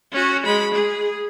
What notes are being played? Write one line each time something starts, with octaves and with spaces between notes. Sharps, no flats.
C#4 F#4
G#3 B5
G#4